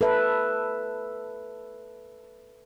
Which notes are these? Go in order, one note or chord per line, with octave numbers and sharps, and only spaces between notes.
A4 B4 E5